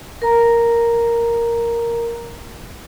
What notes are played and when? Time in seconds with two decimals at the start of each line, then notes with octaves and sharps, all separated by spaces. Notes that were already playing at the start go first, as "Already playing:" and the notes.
0.22 A#4 A#5